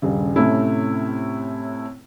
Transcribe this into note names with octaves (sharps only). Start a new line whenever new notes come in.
D#1 G2 C#3
A2 C3 A3 C#4 E4